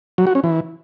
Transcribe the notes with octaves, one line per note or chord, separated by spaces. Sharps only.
F#3
F#4
C#4
E3